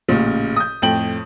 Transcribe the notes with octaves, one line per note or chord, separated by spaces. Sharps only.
A1 A#2 C#3
D#6 G6
F2 A2 G5 F#7